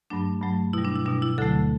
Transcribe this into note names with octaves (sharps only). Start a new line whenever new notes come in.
G2 F#3 A3 D4
G2 F#3 A3
B2 G3 E4
D4
E4
B2 G3 D4
E4
D2 D3 F#3 A3 A4